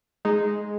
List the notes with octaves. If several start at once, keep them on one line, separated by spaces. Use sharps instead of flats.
G#3 D#4